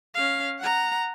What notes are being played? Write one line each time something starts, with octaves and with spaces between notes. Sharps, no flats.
C#4 F5
F#5 A#5